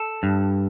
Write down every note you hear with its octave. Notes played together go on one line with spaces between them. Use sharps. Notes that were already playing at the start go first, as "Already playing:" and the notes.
Already playing: A4
G2